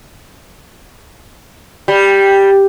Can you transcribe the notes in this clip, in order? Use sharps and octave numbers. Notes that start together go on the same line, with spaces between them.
G3